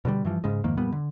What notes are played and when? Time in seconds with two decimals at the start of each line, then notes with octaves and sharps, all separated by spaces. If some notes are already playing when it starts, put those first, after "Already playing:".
0.05 B2 D3 F#3 G3
0.25 G2 E3 F3
0.44 G#2 C#3 G#3
0.64 F2 G#2 D#3 A#3
0.77 F2 A#2 G3 B3
0.92 D3